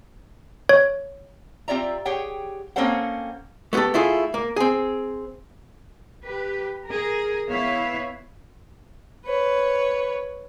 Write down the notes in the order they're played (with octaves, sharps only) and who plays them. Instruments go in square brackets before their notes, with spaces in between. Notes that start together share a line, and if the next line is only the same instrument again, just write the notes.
[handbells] C#5
[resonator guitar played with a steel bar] C4 F4 G4 D5 E5 A#5
G4 G#4 C#5 F#5 G5
A#3 C4 C#4 A4 C5 F#5
[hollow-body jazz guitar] A3 B3 F4 G4 A4
A3 E4 F4 G#4
A#3
C4 G#4
[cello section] G4 B4
G#4 A#4
B3 E4 B4 C#5 E5 F5
[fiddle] B4 C#5